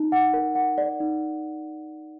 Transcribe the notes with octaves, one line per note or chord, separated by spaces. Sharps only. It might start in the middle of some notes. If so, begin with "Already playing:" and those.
Already playing: D#4
F#5
A#4
F#5
D5
D#4